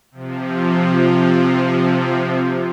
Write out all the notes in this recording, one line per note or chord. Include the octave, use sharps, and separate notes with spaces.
C3 F3